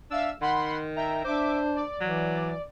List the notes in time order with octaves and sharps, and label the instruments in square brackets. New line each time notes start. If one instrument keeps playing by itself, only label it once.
[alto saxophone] D4 [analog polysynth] E5 F5 E6
[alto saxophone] D#3 [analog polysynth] F#5 B5 C6
[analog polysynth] E5 G5 A#5
[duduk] D4 [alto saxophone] C5 [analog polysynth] E5 D6
[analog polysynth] D5
[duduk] E3 [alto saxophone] F#3